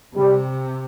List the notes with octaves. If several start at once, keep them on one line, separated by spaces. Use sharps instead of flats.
C3 G3